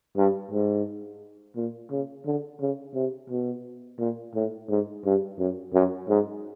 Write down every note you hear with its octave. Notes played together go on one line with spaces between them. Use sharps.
G2
G#2
A#2
C#3
D3
C#3
C3
B2
A#2
A2
G#2
G2
F#2
F#2
G#2